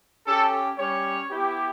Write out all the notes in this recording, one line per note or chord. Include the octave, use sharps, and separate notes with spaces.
C#4 G4 A4
G3 C#4 G4 C#5
B3 E4 G4